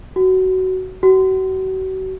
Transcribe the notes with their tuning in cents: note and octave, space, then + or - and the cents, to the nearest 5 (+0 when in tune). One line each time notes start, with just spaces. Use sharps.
F#4 +15
F#4 +35